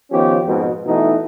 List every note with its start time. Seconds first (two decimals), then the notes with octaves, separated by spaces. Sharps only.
0.11 D#3 F3 B3 C#4 G4
0.45 F2 G#2 B2
0.86 B2 E3 A3 D#4